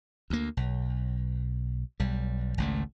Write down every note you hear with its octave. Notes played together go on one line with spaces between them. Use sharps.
D2 A#3
B1
B1 G3
G#1 C#2 A3